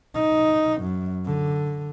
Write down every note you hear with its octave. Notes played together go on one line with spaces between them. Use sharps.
D#4
F#2
D3